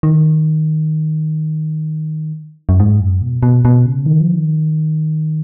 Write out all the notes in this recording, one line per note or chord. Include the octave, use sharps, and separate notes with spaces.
D#3
F#2
G#2
F#2
B2
B2
B2
C#3
D#3
F3
D#3